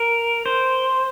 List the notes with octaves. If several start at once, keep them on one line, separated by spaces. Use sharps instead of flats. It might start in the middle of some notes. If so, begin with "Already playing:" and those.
Already playing: A#4
C5